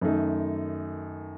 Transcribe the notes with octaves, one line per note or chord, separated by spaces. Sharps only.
F#2 D#3 A3 D#4